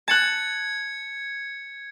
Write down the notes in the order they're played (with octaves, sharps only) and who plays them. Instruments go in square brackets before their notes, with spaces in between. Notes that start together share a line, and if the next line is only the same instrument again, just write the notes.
[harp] A5 F#6 [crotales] G#6 C#7